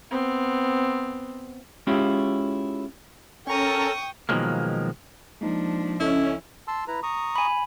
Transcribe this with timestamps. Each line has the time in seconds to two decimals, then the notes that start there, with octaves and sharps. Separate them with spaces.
0.11 B3 C4
1.87 G#3 C#4 E4 F4 G4
3.47 C#4 A4 A#4 G5 A#5 C#6 D#6
4.29 B2 D#3 F3 F#3 G#3 A#3
5.41 F3 G#3 A#3 D4 D#4
6.00 C#2 C#4 E4 A4 D#5
6.68 A5 C6 E6
6.88 E4 B4 A#5
7.03 A#5 C#6 D#6
7.36 G#5 B5